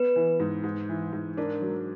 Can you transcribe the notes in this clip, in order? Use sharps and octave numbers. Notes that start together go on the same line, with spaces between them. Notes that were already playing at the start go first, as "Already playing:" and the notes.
Already playing: B3 B4
E3
G#2
G#2
E3
G#2
D4 A#4
F#3